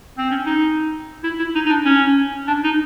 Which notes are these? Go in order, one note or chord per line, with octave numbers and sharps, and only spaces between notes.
C4
C#4
D#4
E4
E4
D#4
D#4
D4
C#4
D4
D#4